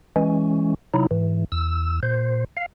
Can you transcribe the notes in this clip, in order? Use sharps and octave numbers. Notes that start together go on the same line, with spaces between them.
E3 G#3 C#4
C3 F#3 D#4 E4
G#2 E3
E2 E6
A#2 C5
F5